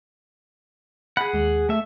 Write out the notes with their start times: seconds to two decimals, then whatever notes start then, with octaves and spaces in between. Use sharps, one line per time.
1.17 G#4 F#5 B5
1.34 D#2 G#3
1.69 A3 E5